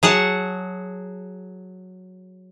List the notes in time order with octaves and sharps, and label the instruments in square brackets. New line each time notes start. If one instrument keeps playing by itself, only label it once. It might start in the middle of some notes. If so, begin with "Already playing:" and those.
[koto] F#3 G#4 F#5 A5